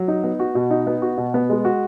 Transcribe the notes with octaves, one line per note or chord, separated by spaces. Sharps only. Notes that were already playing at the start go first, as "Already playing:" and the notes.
Already playing: F#3
D#4
B3
F#4
B2
D#4
B3
F#4
B2
B3
G#3
F#4